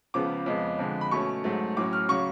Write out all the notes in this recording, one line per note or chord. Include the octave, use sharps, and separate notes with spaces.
C#2 C#3 F3 B3 D6
F2 C#3 G#3 B3
F2 D3 G#3
B5
B2 A3 C#4 C#6
G#2 F#3 A3
A2 F#3 C#4 D6
F6
C#3 F#3 C#6